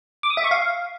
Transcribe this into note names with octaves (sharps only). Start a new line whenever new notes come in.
D6
D#6
E5
C#6
F5